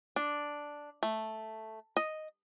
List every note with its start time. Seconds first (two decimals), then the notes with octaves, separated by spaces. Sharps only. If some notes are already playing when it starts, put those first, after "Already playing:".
0.16 D4
1.03 A3
1.97 D#5